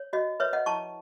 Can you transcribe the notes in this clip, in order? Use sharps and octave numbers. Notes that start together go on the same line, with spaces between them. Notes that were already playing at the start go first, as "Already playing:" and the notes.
Already playing: C#5
F#4 D#5
B4 C#5 E5
D#5 F#5
E4 A5 C#6